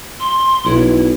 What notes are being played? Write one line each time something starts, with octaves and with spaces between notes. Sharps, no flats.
C6
B1 E4